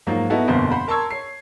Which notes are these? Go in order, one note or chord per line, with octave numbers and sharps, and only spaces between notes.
G#2 F3 F#3 A#3
B3 D#4 E4 F#4 A4
G1 F2 B2 A#3 C5
C5 F#5 B5
A#4 A5 C6 C#6 E6 G#6
C#5 C7